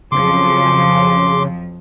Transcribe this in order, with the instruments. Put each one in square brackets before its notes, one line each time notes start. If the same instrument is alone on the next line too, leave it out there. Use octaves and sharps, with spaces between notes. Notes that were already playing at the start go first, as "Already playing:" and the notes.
[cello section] F2 F3 F#3 [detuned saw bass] C#3 [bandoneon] C6 D6